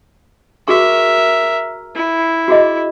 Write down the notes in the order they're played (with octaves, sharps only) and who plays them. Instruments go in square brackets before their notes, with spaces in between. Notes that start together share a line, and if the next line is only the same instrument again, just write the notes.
[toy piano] F#4 G#4 C#6 [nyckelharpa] A#4 E5
[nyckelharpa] E4
[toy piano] F#4 G#4 D#5